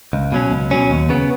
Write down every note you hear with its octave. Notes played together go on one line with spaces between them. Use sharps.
C#2
B2 F#3 C#4
C#2
B2 F#3 C#4
D#2
C#3 B3